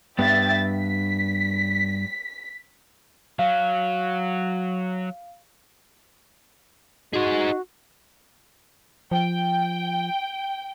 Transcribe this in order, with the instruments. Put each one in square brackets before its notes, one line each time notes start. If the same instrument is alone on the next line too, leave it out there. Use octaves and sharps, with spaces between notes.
[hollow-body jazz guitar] G2 B3 [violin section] E5 G5 A6
[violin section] B6
[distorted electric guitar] F#3 [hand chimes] F5
[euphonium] D#4 [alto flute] F#4 [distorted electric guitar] G#4 C5
[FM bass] F3 [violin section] G5